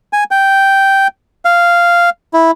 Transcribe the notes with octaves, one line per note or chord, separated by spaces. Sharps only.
G#5
G5
F5
E4